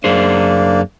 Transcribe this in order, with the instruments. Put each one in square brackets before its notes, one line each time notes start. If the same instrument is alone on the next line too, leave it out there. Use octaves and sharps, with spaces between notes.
[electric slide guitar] F#2 G#4 C5 [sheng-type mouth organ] A#3 D4